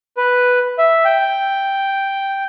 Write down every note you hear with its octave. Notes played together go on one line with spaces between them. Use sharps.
B4
E5
G5